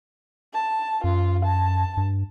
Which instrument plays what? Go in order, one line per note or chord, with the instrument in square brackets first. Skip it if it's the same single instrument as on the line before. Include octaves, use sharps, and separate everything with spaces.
[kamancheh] A5
[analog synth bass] F#2 [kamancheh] F4
[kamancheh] A5
[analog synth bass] G2